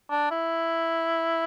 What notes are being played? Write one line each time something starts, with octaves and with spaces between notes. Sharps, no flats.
D4
E4